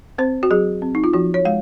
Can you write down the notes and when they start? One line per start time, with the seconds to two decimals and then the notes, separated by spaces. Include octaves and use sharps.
0.18 C4 C5
0.43 F#4
0.51 F#3 G#4
0.82 C4
0.95 D#4
1.04 F4
1.14 F3 F#4
1.34 C#5
1.45 G#3 F5